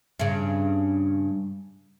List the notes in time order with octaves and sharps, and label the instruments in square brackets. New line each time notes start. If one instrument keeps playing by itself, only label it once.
[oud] G2 C#3